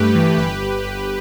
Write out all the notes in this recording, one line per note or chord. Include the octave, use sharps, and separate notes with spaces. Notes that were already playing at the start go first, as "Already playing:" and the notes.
Already playing: G2 A3 G4 B4
E3
G1 G4 B4
G1
G1